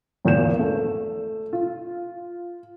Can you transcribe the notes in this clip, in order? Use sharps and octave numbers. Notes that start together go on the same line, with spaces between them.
G#1 E2 A#2 G6 E7
A3
F4